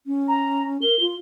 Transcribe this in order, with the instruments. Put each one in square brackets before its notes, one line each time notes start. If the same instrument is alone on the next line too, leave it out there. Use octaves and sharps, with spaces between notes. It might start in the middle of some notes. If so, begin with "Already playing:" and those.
[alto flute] C#4
[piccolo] A#5
[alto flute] A#4 [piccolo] G7
[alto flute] F4